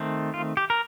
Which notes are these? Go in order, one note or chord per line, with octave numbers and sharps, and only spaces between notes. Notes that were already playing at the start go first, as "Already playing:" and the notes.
Already playing: D#3 A3 C4
F4
G4
A#4